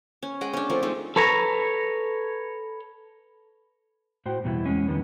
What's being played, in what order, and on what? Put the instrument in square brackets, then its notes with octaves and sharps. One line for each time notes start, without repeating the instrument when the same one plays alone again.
[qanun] C#4
G#3 D#5 F#5 G5
C#4 D4
F3 A3 C4 A#4
G#3 A3 D#4
[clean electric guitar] A4 B4 C#5 A5 A#5
[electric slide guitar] A2 F#4 C5 G5
E2 B2 G3 D4 E4
E2 G#3 C#4
E2 D3 D#3 G3 B3